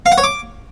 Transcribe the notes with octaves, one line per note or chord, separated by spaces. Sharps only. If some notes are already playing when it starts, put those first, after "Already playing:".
F5
F#5
C#5
D6